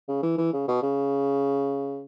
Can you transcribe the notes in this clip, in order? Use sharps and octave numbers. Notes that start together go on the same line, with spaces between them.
C#3
E3
E3
C#3
B2
C#3